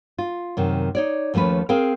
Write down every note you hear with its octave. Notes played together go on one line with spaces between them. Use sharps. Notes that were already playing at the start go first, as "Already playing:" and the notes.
F4
F#2 C3 D#3
D#4 C#5 D5
D#2 F3 A3 C#4 B4
C4 G#4 A#4 F5 G5